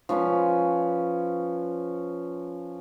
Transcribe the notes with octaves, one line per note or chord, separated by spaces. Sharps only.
F3 C#4 B4 F5